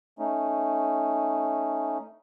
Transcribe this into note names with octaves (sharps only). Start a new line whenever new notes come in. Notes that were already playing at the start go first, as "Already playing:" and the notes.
A3 C#4 D#4